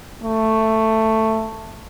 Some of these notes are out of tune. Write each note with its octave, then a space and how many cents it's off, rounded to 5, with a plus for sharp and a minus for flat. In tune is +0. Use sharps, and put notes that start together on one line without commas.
A3 +10